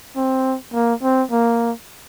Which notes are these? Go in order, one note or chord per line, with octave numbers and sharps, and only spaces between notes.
C4
A#3
C4
A#3